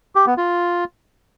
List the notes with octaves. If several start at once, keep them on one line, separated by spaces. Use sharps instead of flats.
G4
B3
F4